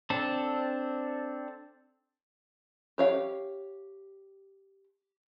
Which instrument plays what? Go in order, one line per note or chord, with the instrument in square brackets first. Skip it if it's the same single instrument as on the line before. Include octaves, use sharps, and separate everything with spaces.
[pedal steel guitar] C4 D4 A4
[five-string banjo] G4 C#5 F5